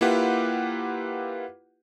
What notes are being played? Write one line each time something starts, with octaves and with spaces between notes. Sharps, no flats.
A#3 E4 F4 G4 B4 F#5